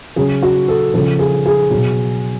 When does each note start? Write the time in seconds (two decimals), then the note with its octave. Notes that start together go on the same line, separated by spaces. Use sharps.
0.16 C#3 F#3 G#4
0.43 F#4
0.68 A4
0.94 C#3 F3 A4
1.19 G#4
1.46 G#4
1.70 B2 F#3